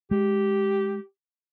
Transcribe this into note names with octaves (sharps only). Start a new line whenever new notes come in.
G#3 G4